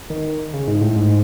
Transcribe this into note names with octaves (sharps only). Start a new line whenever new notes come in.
D#3
C#3
G#2
A2
G#2